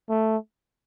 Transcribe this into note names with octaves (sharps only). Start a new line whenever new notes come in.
A3